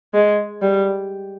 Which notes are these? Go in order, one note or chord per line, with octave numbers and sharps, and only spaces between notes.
G#3
G3